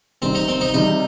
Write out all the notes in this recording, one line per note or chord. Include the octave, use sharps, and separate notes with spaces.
C3 D#3 G3 C4
D#4
C4
D#4
C3 D#3 G3 D#4